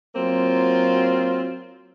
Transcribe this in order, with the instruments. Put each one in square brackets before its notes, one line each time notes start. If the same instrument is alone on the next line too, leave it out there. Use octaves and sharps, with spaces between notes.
[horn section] F#3 A#3 C4 F4